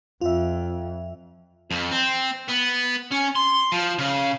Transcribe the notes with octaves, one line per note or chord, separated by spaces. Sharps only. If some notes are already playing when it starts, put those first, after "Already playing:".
F2 F4 E5
F2
C4
B3
C#4
C6
F3
C#3